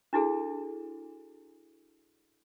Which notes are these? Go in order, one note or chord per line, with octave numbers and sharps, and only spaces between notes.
D4 E4 F#4 G#4 A4